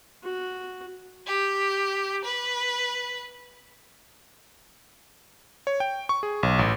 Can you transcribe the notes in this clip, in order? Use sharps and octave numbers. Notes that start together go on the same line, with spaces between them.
F#4
G4
B4
C#5
G5
C#6
G#4
B1
A1